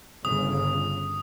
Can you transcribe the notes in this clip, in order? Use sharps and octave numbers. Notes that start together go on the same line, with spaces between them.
G1 C#3 D#6